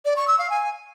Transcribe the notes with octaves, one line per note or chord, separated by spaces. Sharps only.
D5
C#6
E6
F5
G#5